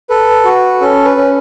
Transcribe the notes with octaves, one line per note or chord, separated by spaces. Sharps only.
A4 B4
F#4
C#4 A4
B4
C#4